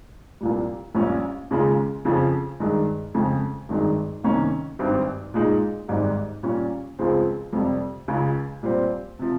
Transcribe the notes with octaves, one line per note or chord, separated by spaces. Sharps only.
C2 A#2 G3
A#1 A#2 G3 C#4
D#2 C#3 G#3 C#4 F4
F2 C#3 F3
G2 D#3 G#3
F2 C#3 G#3
G#1 G2 D#3 G#3
C2 C3 D#3 A#3 C#4
G#1 G2 G3 C4
A#2 G#3 D#4
G#1 G#2 G3
A#2 G3 C#4
C#2 C#3 F3 G#3 C4
F2 C3 G3
C#2 C#3 G#3
A#2 G3 C4
C3 F3